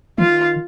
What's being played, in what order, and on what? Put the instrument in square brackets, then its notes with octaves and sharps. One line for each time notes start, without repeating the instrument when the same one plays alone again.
[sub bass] D#3 [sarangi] F4